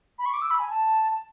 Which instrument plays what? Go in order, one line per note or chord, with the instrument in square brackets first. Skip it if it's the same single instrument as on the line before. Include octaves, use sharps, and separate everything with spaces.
[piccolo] B5
C#6
D6
E6
B5
G#5
A5